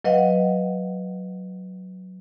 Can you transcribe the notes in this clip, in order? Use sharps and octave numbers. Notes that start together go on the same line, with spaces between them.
F#3 B4 D#5 F5 F#5